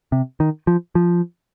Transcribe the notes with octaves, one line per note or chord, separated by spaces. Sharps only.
C3
D#3
F3
F3